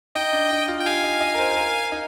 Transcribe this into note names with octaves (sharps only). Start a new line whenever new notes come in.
D#4 D#5 G5
D4
D#4
F4
G5
G4 F5 G#5
D#5
D#5
A#4
C5
C5
A#4
D#4